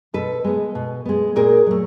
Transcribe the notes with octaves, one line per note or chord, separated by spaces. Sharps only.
B2 A4 B4
G#3 B3
B2
G#3 B3
A#2 G#4 A#4
F#3 A3